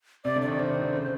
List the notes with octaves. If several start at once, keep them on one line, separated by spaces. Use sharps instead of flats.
C3 D5
D3
D5
D#3
D#3 C5
D#3
D3
C#3